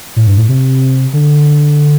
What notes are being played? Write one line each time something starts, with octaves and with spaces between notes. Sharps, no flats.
A2
G2
A2
C3
D3